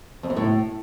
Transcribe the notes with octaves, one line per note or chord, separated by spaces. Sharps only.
F2
F#2
A2